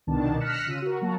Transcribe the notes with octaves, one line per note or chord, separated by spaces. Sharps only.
C2 B2 D#3 D4 A5
F6 F#6 A#6 B6 C#7 E7
C#3 F4 E6 D#7
F#4 A#4
F#3 A#3 F#4 A5 A#5